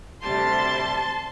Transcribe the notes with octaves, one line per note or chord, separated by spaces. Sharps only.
D2 C3 G3 A5 C6